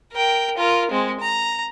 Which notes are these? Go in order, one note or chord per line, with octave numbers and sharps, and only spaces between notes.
A#4 G5
F4 A#4
G#3 C4
A#5